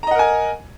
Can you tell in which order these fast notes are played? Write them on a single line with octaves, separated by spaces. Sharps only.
A#5 D#5 F#5 A#4 G#5